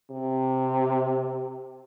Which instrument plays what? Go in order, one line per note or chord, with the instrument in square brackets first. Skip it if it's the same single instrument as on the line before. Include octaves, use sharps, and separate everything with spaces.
[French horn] C3